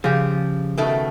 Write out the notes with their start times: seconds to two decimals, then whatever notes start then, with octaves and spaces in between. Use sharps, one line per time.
0.04 C#3 F3 G4
0.78 B2 D#3 A3